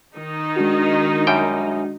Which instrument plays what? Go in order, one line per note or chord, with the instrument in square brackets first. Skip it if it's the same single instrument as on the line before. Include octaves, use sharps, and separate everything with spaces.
[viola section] D#3 D#4
[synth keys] G#3 D4 F#4
[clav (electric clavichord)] F#2 G3 G5